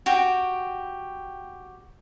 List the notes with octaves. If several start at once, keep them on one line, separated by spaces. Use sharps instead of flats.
F#4 G4 G5